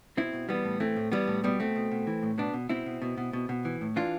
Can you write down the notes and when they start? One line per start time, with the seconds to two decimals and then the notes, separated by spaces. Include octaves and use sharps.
0.17 B2 C4 E4
0.33 B2
0.49 E3 G3 B3
0.65 A2
0.80 E3 A3 C4
0.96 A2
1.12 E3 G3 B3
1.27 A2
1.44 B2 G3 B3
1.59 B2 A3 C4
1.76 B2
1.91 B2
2.07 E3
2.23 A2
2.38 B2 B3 D4
2.54 B2
2.69 B2 C4 E4
2.86 B2
3.02 B2
3.18 B2
3.33 B2
3.49 B2
3.65 E3
3.81 A2
3.96 E3 D4 F4